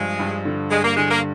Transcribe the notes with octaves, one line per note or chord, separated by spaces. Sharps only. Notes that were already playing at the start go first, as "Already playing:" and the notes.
Already playing: G2 F3 G#3
G2
D3
G2 G#3
A#3
D3 G#3
A#3